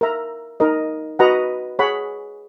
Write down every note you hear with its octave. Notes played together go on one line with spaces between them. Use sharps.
A#4 E5 A#5
D#4 A#4 D#5
F#4 B4 D#5 F#5 A#5
G#4 C#5 F#5 B5